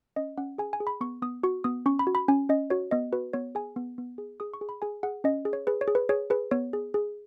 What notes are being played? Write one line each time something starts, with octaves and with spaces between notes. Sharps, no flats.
C#4 D#5
C#4 F#5
G#4 G#5
G#5
G#4
B5
B3 C#6
B3 D#6
F#4 C#6
B3 D#6
C#4 C#6
B5
F#4
B5
C#4 G#5
C#4 D#5
F#4 C#5
B3 D#5
F#4 B4
B3 C#5
G#4 G#5
B3
B3
G#4
G#4 D#6
C#6
G#4
B5
G#4 G#5
G#4 F#5
C#4 D#5
G#4
C#5
G#4 B4
C#5
G#4
B4
G#4 C#5
G#4 B4
B3 C#5
G#4
G#4